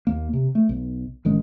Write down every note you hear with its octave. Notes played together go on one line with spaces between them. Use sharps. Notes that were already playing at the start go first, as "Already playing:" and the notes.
D#2 A#3
C3
A3
B1
A1 D#3 G#3 C#4